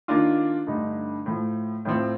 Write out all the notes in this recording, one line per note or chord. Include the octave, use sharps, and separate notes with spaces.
D#3 A#3 D4 F4
G2 D3 A3 D#4
A2 F3 A3
A2 F3 C4